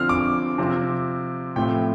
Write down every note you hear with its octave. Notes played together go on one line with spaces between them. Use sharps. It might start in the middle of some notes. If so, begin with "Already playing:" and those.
Already playing: D3 F3 C4 F6
D6
C3 F3 C4
A2 F3 A3 C4 G5